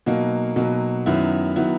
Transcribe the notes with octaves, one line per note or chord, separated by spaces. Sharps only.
B2 F#3 A#3 D#4
B2 F#3 A#3 D#4
F#2 D#3 F#3 B3 E4
D#3 F#3 B3 E4